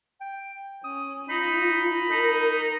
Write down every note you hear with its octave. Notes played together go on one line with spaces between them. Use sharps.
G5
C#4 D#6
D#4 F4 B5
D#4 A#4